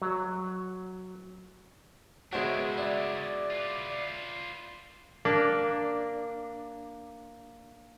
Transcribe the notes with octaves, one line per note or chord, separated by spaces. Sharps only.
F#3
C#3 G#3 B3 D4 E4 F#4 C5 C#5
E4 D5
F4 B4
A#3 D4